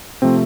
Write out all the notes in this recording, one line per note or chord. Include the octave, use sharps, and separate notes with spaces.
C3 F3 A3 C4